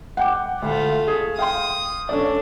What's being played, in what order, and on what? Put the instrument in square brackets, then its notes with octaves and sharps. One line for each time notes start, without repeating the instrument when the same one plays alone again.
[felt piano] F#5 G5 D6
[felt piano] D2 [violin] A3 F4
[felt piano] G#4
[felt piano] F5 G5 C6 [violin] D#6
[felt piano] C#4 A4 D5 [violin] D4